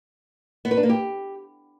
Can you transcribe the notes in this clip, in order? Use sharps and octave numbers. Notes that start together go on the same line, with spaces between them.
B3
B4
D4
A#3
G4